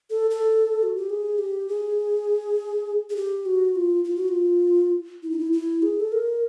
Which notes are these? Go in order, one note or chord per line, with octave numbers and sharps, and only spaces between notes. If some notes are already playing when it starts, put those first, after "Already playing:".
A4
A4
F#4
G4
G#4
G4
G#4
G#4
G4
F#4
F4
F4
F#4
F4
E4
D#4
E4
E4
G#4
A4
A#4